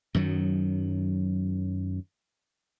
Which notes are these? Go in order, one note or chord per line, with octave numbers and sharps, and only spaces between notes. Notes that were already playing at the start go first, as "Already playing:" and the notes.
F#2 D#3 F#3